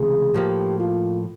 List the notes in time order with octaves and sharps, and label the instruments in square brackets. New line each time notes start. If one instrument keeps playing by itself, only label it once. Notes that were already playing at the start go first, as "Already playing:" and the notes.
Already playing: [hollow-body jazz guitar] C#2 C3 E3 A3 [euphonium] G#4
[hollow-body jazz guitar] A2 F3 A#3 [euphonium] G4
[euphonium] F4